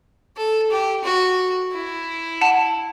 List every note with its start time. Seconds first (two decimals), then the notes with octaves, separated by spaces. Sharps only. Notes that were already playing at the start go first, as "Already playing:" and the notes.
0.37 A4
0.70 G4
1.04 F#4
1.73 E4
2.41 F#5 A5